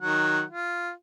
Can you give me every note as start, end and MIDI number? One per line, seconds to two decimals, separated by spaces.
0.01 0.42 51
0.01 0.42 54
0.01 0.42 78
0.50 0.91 65